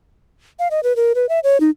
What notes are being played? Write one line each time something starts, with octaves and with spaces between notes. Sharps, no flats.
F5
D#5
B4
A#4
B4
E5
C#5
D#4